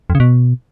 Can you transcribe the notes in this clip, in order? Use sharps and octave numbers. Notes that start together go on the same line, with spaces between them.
F2
C#3
B2